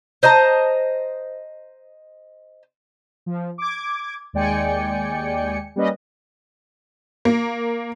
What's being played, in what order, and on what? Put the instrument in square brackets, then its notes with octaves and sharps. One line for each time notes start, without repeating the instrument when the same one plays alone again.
[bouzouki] C5 D#5 A5 A#5
[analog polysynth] F3
D6 G#6
D#2 G#3 D5 G5 G#5 C#7
G3 A#3 C#4 B4 D#5
[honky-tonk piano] A#3